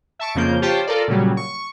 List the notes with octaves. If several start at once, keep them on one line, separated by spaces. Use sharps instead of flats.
E5 A5 C#6 D7
F2 C#3 F3 A#3 G6
F4 G4 C5 C#5 G5 A5
F4 A4 A#4 D5
A#2 C#3 F#3 G3
C#6